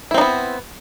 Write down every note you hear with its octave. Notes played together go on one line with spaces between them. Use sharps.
B3 C4 D#4 E4